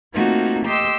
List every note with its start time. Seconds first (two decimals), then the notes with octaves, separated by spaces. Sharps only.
0.14 A3 A#3 C4 D#4 F4 F#4
0.65 G4 D#5 C6 E6